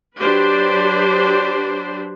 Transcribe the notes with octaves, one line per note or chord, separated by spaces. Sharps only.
F#3 D4 G4 B4 C5